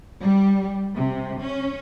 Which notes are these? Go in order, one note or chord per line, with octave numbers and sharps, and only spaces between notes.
G3
C3
C#4